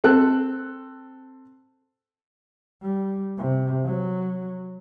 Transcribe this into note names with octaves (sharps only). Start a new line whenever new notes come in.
C4 A4 F#6
G3
C3
F#3